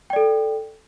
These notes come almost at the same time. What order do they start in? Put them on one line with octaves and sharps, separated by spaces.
G5 D5 A4